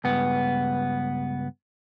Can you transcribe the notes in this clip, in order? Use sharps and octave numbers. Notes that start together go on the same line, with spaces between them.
C#2 G2 B3